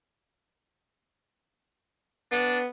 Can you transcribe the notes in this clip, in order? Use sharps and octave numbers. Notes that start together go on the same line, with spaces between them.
B3 D4